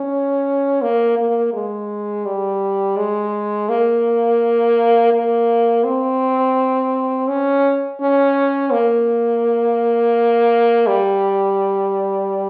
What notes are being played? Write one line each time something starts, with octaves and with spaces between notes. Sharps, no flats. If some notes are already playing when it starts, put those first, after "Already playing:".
Already playing: C#4
A#3
A#3
G#3
G3
G#3
A#3
A#3
C4
C#4
C#4
A#3
G3